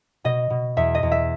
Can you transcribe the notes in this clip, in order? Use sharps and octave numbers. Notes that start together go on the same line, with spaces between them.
B2 D#5
B2
E2 E5
D#5
E2
E5